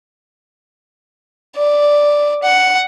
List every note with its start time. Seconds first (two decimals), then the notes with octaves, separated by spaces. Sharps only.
1.56 D5
2.43 F#5